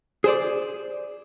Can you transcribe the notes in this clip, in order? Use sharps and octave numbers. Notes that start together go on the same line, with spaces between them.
G#4 C5 D5